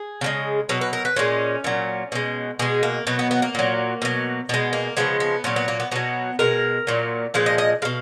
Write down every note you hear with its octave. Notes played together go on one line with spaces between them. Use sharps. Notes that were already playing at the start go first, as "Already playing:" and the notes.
Already playing: G#4
C#3 F3 G#3
B2 F#3 B4
B4
A#4
B4
A#2 G#3 C#4
A#2 F#3
B2 G#3
B2 G#3 G#4
A#3
B2 F#3 B3
B3
B3
A#3
A#2 F#3
B2 F#3
B2 G#3 B3
A#3
C#3 F3 G#3 B3
B3
A#2 F#3 C#4
B3
A#3
B3
B2 F#3 B3
B2 G#3 A#4
A#2 F#3
A#2 F3 G#3 B4
D#5
D#5
B2 G#3 F5